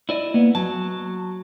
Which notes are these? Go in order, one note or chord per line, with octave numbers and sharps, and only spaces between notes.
E4 D5 D#5
A#3 B3
F#3 A5